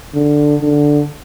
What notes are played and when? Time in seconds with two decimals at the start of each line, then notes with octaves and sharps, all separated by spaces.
0.15 D3
0.61 D3